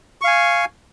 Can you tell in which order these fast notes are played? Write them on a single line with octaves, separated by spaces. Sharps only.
C#6 F5 G#5